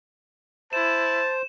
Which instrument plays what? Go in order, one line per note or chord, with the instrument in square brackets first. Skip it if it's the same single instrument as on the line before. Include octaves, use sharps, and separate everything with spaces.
[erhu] E4 [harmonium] C5 [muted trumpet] A5 [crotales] E7